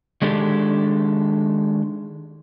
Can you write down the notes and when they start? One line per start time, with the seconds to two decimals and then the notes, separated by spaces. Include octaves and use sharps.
0.22 D#3 G#3 D4 G4 A4